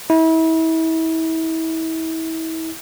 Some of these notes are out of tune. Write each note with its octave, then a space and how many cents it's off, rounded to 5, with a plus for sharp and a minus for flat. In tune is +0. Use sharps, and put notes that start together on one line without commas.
E4 -35